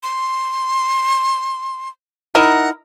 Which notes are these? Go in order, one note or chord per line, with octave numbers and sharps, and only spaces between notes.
C6
D#4 E4 A#4 F#5